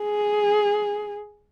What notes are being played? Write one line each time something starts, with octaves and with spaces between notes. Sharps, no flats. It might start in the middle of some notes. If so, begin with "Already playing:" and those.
Already playing: G#4